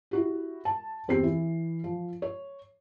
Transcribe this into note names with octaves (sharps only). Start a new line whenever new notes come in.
E4 F#4 G4
A5
E2 C4 G4 C7
E3
F3
C#5